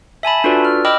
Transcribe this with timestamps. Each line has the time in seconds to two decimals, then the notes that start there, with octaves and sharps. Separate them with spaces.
0.23 E5 G#5 A5 B5
0.44 D4 F4 F#4 A4 B4 D5
0.65 F6
0.85 D#5 G5 B5 D6 E6 F6